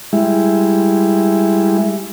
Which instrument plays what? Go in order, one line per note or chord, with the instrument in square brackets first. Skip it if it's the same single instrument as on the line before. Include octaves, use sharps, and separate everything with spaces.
[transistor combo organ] G3 G#3 E4